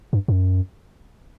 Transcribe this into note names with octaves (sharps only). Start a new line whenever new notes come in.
G2
G2
F#2